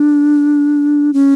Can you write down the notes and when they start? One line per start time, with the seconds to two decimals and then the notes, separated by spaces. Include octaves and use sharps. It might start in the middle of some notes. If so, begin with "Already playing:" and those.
Already playing: D4
1.13 C#4